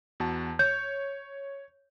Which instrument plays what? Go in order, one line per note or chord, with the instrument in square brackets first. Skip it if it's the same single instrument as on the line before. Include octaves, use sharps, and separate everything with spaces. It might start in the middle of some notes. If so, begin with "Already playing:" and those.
[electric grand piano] E2 F#4 A5
[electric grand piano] C#5 [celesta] G6